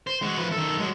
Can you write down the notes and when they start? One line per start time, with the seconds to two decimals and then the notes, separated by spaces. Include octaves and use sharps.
0.07 C5
0.22 G#3 F#4
0.37 F3 B4
0.52 D#3 A4
0.78 F#3 G#3